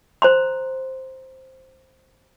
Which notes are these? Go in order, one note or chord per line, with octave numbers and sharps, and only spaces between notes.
C5 A#5 C6